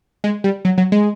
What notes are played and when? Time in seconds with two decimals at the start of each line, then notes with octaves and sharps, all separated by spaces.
0.24 G#3
0.44 G3
0.65 F#3
0.78 F#3
0.92 G#3